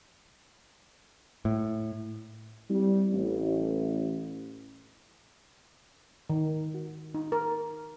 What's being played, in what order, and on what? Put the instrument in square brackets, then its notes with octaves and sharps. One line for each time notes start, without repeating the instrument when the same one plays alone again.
[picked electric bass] A2
[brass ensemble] G3 C4 E4
A1
[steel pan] D#3
F#4
D#4
A#4